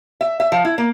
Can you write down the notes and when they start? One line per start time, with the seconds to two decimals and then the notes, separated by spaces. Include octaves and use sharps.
0.21 E5
0.40 E5
0.52 F3
0.65 E4
0.78 A#3